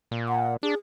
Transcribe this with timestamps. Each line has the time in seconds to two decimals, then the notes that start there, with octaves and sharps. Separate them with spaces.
0.11 A#2
0.28 F#5
0.63 D4 G#4